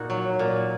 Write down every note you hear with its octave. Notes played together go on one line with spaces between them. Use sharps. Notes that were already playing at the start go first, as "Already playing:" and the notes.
Already playing: A#2 D#4 F#4
F#3
A#2